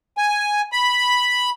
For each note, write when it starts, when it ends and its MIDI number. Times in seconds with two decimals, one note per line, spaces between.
0.18 0.62 80
0.72 1.50 83